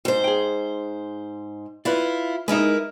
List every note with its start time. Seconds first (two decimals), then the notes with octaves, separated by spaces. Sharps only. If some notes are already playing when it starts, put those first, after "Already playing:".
0.05 G#2 C5
0.24 G#4 G5
1.85 E4 F4 B4 D5
2.48 G#3 D#4 E4 A#4 B4